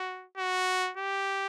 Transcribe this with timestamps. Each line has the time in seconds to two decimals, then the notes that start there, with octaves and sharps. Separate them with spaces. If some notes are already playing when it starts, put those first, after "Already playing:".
Already playing: F#4
0.37 F#4
0.97 G4